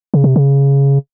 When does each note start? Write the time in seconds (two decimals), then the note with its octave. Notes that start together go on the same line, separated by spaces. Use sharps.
0.14 C#3
0.24 C3
0.36 C#3